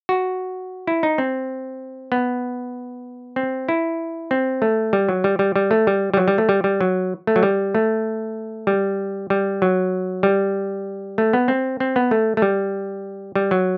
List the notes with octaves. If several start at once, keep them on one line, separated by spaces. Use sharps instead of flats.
F#4
E4
D#4
C4
B3
C4
E4
C4
A3
G3
F#3
G3
G3
G3
A3
G3
G3
F#3
G3
A3
G3
G3
F#3
A3
F#3
G3
A3
G3
G3
F#3
G3
A3
B3
C4
C4
B3
A3
A3
G3
G3
F#3